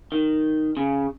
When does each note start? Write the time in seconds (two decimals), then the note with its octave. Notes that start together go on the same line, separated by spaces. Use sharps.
0.12 D#3
0.77 C#3